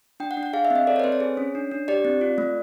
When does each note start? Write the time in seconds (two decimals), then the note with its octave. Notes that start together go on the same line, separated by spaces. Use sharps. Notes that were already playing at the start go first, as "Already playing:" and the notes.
0.20 D4 G5
0.31 F#5
0.37 D4
0.43 F#5
0.53 G#4 F5
0.65 E5
0.70 C4
0.76 D#5
0.87 A4 D5
0.96 B4 C#5
1.04 C4 C5
1.12 C#5
1.20 G#4
1.37 C#4
1.55 D4
1.71 D4
1.88 G4 D5
2.05 C4
2.21 F4
2.38 A3